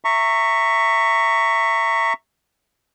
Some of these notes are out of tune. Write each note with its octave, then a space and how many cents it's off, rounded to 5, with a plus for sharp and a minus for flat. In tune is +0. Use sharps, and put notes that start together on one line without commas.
E5 +5 A#5 -20 C#6 +0